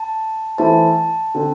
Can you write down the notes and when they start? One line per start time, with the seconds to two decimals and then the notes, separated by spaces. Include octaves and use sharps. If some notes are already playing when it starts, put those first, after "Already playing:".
Already playing: A5
0.58 E3 A3 E4 C5 E5 A5
1.35 D3 C4 A4 C5